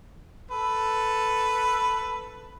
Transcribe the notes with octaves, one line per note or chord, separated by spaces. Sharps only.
A4 B4